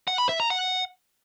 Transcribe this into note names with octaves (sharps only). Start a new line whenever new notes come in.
F#5
B5
E5
A#5
F#5